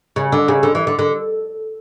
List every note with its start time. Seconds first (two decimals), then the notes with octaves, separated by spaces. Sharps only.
0.16 C#3
0.32 D3
0.48 C#3
0.63 D3
0.75 E3
0.87 D3
0.99 D3